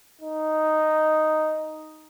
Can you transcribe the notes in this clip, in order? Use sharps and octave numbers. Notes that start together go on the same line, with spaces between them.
D#4